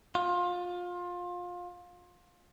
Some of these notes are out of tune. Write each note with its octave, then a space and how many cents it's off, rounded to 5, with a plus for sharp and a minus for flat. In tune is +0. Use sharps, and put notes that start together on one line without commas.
F4 +25